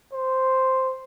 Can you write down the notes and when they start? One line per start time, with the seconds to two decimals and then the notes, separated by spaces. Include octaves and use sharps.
0.12 C5